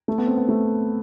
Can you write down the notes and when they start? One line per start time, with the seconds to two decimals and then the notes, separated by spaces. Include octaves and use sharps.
0.08 A3
0.18 B3
0.27 C4
0.37 B3
0.49 A3